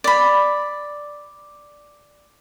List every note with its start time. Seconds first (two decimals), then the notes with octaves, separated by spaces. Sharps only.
0.04 D5 B5